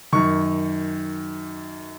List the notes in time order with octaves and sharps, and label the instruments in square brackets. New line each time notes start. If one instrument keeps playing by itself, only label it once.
[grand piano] F#2 D#3 C#6